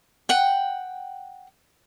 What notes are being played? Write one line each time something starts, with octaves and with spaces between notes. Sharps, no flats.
F#5 G5